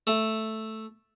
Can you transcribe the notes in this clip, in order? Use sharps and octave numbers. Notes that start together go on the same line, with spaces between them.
A3